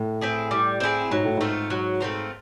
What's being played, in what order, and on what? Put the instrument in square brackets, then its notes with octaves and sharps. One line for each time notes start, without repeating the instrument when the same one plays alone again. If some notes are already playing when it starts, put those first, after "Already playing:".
Already playing: [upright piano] A2
[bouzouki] C4 E4 G#4
G3
C4 E4 G#4
[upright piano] G#2 [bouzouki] F#3
[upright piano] A2
[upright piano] G#2 [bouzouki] A3 C4 F4
[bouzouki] F#3
A3 C4 F4